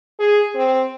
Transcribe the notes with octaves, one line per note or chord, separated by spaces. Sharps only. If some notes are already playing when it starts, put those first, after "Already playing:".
G#4
C4